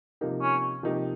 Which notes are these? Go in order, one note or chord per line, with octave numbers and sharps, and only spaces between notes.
C3 F3 A#3 D#4 G4
C#4
C3 F3 A#3 D#4 G4